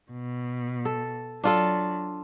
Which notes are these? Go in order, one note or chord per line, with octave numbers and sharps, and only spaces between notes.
B2
A4
F#3 D4 F4 A4